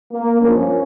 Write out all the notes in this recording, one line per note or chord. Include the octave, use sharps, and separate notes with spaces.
A#3
G2 F3 C#4